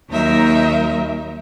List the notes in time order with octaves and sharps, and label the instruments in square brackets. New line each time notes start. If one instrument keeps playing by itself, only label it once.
[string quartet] D#2 F#3 D#4 A#4 E5